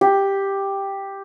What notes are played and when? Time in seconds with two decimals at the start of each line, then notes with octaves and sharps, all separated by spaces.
0.01 G4